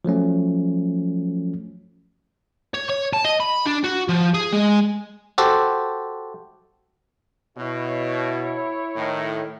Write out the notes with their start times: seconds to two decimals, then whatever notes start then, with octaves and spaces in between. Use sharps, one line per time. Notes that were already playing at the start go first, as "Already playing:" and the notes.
0.05 F3 F#3 A3 C#4
2.74 C#5
2.89 C#5
3.13 A5
3.25 D#5
3.40 B5
3.66 D4
3.84 F#4
4.09 F3
4.34 G#4
4.53 G#3
5.38 F#4 G4 A4 C5
7.58 B2 E4 C#5
8.96 A2 D#3